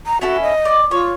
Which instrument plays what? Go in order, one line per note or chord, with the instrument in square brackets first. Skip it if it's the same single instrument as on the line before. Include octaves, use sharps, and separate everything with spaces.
[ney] A#5
[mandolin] C#4 E4 A4 [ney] F#4
[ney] D#5
[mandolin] D5
[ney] F4 [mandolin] C#5